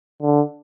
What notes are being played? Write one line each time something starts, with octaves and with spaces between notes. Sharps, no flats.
D3